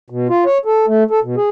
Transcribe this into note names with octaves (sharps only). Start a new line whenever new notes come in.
B2
F4
C#5
A4
A3
A4
B2
G#4